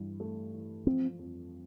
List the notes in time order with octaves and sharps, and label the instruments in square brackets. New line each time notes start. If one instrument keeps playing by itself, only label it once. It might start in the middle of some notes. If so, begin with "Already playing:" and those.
Already playing: [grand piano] G2 E3
A3
E3
[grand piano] F3 [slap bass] C4
[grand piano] F2